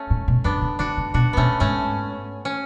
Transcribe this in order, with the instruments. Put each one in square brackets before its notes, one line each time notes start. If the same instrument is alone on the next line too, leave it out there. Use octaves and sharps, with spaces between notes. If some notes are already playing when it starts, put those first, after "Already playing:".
Already playing: [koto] A3 C#4
[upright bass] A2
B2
[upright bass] F#2 [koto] B3 D4
[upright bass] C#3
[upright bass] D3 [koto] D4 F#4
[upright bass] C#3
[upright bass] B2 [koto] D4 F#4
[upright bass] B2 [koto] A3 B3 C#4
[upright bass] G#2 [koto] A3 C#4
[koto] C#4